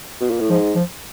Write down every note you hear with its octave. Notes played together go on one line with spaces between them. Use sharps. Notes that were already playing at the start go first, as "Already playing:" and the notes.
B2
A#2
A2
G#2 F3
F3